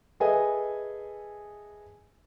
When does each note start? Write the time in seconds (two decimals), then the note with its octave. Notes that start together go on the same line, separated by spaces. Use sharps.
0.20 G#4 A4 B4 D#5 E5 G#5